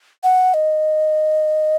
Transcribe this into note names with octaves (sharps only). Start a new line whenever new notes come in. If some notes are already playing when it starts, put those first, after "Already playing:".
F#5
D#5